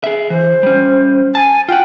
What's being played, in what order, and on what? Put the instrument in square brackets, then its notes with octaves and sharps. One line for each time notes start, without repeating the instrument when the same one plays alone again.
[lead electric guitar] G#4 E5
[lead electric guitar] E3 [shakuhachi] C5
[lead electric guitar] G3 C#4
[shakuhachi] G#5 [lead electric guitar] A5
[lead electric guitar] F4 F#5 [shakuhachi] G5